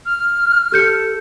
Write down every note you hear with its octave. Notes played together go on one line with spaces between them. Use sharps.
F6
G4 A4 G6 C#7